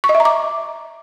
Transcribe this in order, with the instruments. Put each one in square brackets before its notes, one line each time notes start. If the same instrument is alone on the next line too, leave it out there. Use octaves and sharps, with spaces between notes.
[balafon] C#6
D#5
E5
A#5
D6